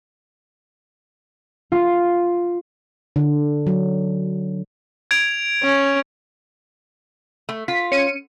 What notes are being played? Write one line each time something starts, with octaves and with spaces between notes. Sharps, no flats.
F4
D3
F#3
G#6 D7 F7
C#4
A3
F4 B6
C#4 C#7 D#7